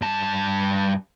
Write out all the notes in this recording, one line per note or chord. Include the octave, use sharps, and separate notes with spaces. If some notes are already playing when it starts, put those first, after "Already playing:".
G2 A5